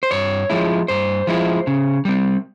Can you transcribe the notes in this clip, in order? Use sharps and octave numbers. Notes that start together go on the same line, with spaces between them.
C5
G2 C#5
F3 G#3 E4
G2 C5
F3 G#3 E4
C#3
G3 C4